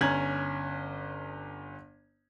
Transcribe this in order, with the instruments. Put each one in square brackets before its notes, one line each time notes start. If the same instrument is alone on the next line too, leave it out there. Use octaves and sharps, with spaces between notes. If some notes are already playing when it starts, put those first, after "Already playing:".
[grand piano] G1 C#4 A#5 G#6 F#7